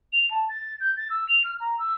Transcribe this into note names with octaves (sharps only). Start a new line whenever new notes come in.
F7
A5
A6
G6
A6
E6
F7
F6
A#5
E6